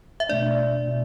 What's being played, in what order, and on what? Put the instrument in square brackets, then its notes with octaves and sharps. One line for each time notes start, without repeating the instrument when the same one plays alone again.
[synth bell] E5
[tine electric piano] B2 A3 D4 [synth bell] D5
[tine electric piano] B2